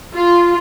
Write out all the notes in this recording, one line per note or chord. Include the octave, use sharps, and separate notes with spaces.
F4